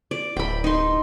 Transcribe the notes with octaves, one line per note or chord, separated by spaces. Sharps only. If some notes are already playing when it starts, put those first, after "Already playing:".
D5
D1 G5 B5
D#4 C6